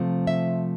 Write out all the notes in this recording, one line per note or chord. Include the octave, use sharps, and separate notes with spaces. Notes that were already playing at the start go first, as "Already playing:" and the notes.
Already playing: C3 F3 A3 C4
E5